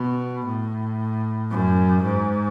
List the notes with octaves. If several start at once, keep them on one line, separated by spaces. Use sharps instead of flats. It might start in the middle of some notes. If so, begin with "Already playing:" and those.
Already playing: B2
A2
F#2
G#2